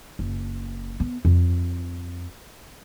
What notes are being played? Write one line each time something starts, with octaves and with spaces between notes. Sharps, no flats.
F#1
B3
F2